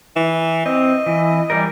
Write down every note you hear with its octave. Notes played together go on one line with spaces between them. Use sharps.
E3
C4 D#5
E3
E3 G3 A#4